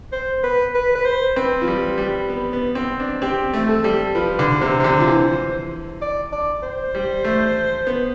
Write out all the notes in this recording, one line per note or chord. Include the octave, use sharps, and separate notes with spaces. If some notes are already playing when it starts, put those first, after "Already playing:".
C5
B4
B4
B4
C5
C4 B4
F3
G3
G3
B3
B3
C4
D4
C4 G4
A3
A4
G3
F3 B4
D3
C3 C5
C3
D3
F3
E3
D5
D5
C5
G3
A3
B3